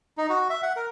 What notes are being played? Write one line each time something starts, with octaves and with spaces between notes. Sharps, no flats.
D#4
F#4
E5
F#5
A#4